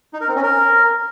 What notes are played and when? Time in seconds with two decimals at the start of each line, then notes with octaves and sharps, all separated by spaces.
0.13 D#4
0.21 A#4
0.28 C4
0.36 C#4
0.43 A#4